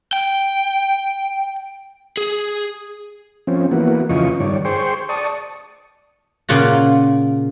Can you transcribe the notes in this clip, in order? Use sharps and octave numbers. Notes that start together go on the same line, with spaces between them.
G5
G#4
F3 C4 C#4
E3 A#3 B3 F#4
F2 C#3 E3 F4 D#5 C#6
G2 D#3 C#5 D5
G#4 C5 G5 C6 C#6
D5 A5 C#6 D#6
A#2 C#3 F4 F#4